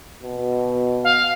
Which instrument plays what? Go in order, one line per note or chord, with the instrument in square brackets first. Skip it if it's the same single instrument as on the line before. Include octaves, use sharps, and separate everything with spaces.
[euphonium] B2
[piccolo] F5